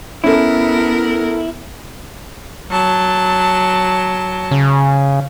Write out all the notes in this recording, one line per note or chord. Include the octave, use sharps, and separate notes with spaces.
B3 C#4 E4 A4 A#4
F#3 A5
C#3